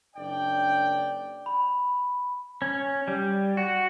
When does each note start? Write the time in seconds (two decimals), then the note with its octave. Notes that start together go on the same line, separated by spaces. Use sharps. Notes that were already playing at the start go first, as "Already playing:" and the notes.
0.16 F#1 D4 D5 G5
1.46 B5
2.62 C#4
3.08 G3
3.57 F#4